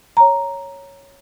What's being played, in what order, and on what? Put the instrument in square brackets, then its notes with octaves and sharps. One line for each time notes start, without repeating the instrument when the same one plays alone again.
[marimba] C#5 A#5